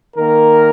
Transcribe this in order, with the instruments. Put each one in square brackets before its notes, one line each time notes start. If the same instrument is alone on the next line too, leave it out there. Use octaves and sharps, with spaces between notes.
[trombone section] D#3 A#3 A#4